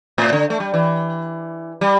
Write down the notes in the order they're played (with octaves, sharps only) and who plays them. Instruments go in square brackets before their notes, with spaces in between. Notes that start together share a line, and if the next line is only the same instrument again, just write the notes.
[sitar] A2
D3
A3
G3
E3
G3